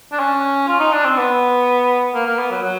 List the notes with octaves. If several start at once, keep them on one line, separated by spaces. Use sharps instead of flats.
D4
C#4
F4
D#4
D4
C4
B3
A#3
A#3
B3
F#3
F#3